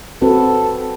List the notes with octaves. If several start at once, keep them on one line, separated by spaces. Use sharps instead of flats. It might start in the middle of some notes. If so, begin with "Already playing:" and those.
C4 F#4 A4 B4